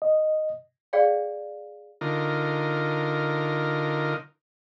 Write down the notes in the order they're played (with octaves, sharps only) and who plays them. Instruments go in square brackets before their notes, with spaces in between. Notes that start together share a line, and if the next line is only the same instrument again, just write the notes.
[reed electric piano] D#5
[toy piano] G#4 C#5 D5 F5 G5
[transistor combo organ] D3 D#4 F4 A#4